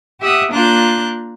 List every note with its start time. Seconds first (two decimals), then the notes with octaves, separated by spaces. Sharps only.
0.20 G4 E5 F#5 D#6
0.50 A#3 D4 F4 A#5 F#6 G6